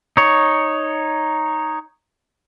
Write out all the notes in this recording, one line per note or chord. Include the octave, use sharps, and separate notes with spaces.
D#4 C#5